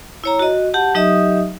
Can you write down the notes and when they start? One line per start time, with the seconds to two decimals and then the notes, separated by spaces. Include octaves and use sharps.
0.24 E4 C#5 A#5
0.39 F#4 D#5
0.74 G4 F#5 A5
0.95 F#3 D#4 G4 D#5 E5 D#6